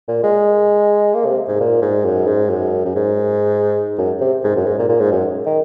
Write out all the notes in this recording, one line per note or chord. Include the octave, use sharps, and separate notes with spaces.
A#2
G#3
A#3
C3
G#2
A#2
G#2
F#2
G#2
F#2
F#2
G#2
F#2
C3
G#2
F#2
G#2
A#2
A#2
G#2
F#2
D#3